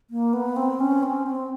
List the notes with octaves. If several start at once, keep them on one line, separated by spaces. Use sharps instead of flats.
A#3
B3
C4
C#4
C4
C4